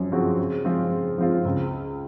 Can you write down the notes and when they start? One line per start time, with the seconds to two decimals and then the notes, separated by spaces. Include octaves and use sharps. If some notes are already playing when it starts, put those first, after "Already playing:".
Already playing: F#2 F3 C4
0.12 C#3 F3 C4 F#4
0.38 C#3
0.65 F3 G#3 C4 F4
0.92 C#3
1.18 F3 G#3 C4 F4
1.45 C#2